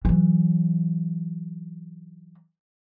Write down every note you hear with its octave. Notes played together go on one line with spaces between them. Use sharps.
E3 F#3